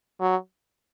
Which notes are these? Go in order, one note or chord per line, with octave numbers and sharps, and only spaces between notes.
F#3